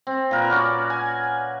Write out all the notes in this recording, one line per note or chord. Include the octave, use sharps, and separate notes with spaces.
C4
A#2 A#4 B4
C#4 F#4 D5
G#5